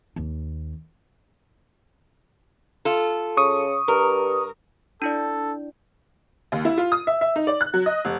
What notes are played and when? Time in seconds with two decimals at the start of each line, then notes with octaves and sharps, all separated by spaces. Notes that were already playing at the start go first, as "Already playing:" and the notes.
0.16 D#2
2.85 F4 A4
3.37 C#3 C#6 D#6
3.88 G2 A#4
5.02 D4 E4 A4 D5
6.52 D#2
6.65 E4
6.78 F4
6.92 D#6
7.07 E5
7.21 E5
7.36 D#4
7.47 D5
7.61 F#6
7.74 F#3
7.86 D#5
8.05 F1